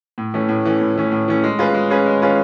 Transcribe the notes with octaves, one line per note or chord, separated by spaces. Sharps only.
A2
E3 A3 C#4
A2
E3 A3 C#4
A2
E3 A3 C#4
A2
E3 A3 C#4
G#3
C#4 F4 G#4 B4
G#3
C#4 F4 G#4 B4
G#3
C#4 F4 G#4 B4